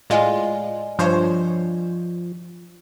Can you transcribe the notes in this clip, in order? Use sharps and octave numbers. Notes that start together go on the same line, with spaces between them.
A2 G#3 F4 D5 D#5 G#5
G2 F3 C5 C#5